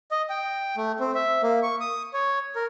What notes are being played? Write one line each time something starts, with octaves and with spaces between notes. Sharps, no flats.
D#5
G5
A3
C4
E5
A#3
C#6
D#6
C#5
A#4